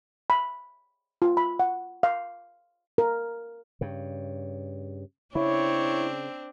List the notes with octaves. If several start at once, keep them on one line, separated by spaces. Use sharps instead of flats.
B5
F4
B5
F#5
F5
A#4
G2 C#3
C#3 C4 D4 E4 C#5